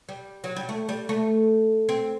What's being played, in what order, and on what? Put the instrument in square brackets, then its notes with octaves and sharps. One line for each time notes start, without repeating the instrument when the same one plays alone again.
[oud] G3
F#3
G3
A3
G3
A3
C4